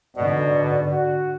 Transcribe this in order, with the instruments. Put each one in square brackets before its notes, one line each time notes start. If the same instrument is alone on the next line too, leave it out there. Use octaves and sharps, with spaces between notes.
[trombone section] B1 B2 [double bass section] G#2 D3 [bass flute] D5
[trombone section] F#4